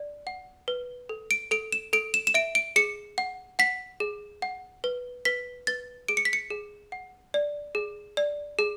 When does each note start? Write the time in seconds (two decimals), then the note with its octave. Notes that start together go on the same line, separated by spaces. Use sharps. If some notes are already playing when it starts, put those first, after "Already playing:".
Already playing: D5
0.27 F#5
0.68 B4
1.09 A4
1.31 D7
1.51 A4 D7
1.72 E7
1.93 A4 D7
2.14 E7
2.27 E7
2.34 E5 D7
2.55 D7
2.76 G#4 C#7
3.18 F#5
3.59 F#5 B6
4.00 G#4
4.42 F#5
4.84 B4
5.25 B4 B6
5.67 B4 A6
6.08 G#4 D7
6.17 C#7
6.25 B6
6.33 C#7
6.50 G#4
6.92 F#5
7.34 D5
7.75 G#4
8.17 D5
8.59 G#4